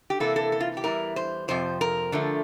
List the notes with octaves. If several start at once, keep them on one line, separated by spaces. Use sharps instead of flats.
G4
C3 E3 A#3 E4 A4
A4
A4
F4
G4
E2 E3 G3 C4 E4 A#4
C5
F2 C3 F3 C5
A#4
D3 F3 A3